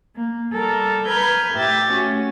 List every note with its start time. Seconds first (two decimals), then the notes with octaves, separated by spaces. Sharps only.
0.17 A#3
0.53 G3 A4 A#4
1.06 A#4 B4 B5 F6 G6 G#6
1.54 A2 G4 E5 A6
1.92 A3 C#4 F#4